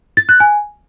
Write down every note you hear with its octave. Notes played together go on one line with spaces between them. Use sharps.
A6
F#6
G#5